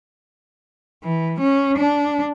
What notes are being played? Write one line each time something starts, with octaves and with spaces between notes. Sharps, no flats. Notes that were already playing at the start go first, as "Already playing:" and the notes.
E3
C#4
D4